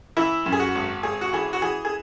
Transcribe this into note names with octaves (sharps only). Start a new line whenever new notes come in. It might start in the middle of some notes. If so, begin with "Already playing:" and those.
E3 E4
F#2
G#4
F#4
G#1
G#1 G#4
F#4
E3 G#4
F#4
E3 G#4
G#4